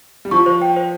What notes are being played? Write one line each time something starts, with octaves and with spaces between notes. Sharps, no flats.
G3
F3 C#6
C5
G5
C5